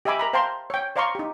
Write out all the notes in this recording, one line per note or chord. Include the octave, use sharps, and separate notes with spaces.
G4 D#5 E5 G#5 B5 D6
A#4 A#5 B5
C5 F5 G5 A5 A#5 C6
C#5 G5
C5 D5 F5 A#5 C6 C#6
D#4 G4